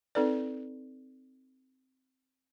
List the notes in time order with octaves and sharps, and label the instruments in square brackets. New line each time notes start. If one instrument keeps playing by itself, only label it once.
[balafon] C4 D#4 A4 B4 D5